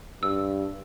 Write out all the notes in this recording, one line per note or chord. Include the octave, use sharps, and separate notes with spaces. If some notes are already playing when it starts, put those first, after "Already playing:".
G2 E6